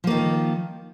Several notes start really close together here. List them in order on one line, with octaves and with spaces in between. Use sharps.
F3 A#3 D#3